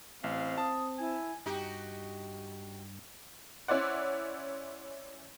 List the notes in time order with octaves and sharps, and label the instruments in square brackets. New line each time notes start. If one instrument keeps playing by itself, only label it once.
[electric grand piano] A1 [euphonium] C4 [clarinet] F5
[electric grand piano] A5 [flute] D#6
[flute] E4 [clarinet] G#5
[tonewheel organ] G2 [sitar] D#4 F#4 G4
[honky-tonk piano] C#4 E4 C5 D5 F#5